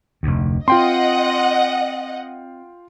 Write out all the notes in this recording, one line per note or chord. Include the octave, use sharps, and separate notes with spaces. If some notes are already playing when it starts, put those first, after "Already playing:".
F1 D2
C4 F4 D#5 F#5 G5 C6